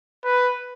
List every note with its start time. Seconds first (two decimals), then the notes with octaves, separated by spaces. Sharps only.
0.25 B4